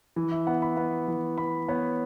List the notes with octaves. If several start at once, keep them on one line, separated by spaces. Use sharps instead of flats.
E3
E5
B3 F#5
B5
B3
E3
B3 B5
B3 C#5